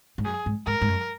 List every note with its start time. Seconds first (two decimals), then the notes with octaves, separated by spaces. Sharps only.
0.18 G#2
0.25 F#2 G#4
0.46 G#2
0.66 G#2 A#4
0.82 G#2
0.88 F#2